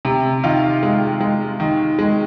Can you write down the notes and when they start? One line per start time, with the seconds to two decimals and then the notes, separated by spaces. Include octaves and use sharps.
0.05 C3
0.44 D#3 F4 F5
0.83 G#3
1.21 G#3
1.60 D#3
1.99 G#3